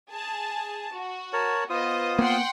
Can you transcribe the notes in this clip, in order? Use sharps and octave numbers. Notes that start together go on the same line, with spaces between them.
G#4 A5
F#4
A#4 C#5 A5
B3 F4 C5 D#5 D#6
A#3 B3 F#5 G5 C6